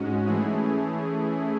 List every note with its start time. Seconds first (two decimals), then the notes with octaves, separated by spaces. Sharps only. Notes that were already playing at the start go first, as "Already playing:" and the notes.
Already playing: G#2 G#3 C#4 F#4
0.26 E3 A3 C#4 E4 G#4